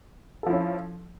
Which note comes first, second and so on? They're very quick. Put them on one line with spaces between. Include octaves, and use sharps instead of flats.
A4 F3 E4 C#4